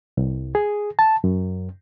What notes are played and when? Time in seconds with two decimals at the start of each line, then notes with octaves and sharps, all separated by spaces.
0.17 C2
0.55 G#4
0.99 A5
1.24 F#2